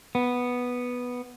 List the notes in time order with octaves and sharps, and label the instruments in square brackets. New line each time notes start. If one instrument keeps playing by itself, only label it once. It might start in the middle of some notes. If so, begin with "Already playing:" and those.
[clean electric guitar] B3